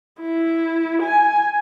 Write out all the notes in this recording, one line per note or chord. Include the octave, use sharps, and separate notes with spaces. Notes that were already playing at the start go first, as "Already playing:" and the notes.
E4
G#5